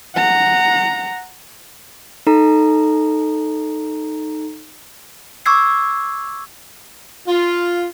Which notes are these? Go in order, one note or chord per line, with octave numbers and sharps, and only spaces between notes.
F#5 A#5
D#4 A4 A#5
C#6 D6 E6 G#6 C7
F4